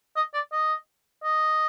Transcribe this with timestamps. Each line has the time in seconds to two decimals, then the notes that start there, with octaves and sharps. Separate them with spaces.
0.16 D#5
0.34 D5
0.52 D#5
1.23 D#5